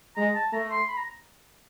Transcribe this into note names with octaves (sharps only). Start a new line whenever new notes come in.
G#3 A#5
A5
A3 A#5
C6
B5
A#5